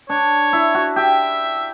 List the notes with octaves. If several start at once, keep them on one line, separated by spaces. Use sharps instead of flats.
D4 C#5
E4
F#4
G4 E5